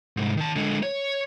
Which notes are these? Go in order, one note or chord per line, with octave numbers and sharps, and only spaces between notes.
C2 G#2
D#3 A5
D3 G#3
C#5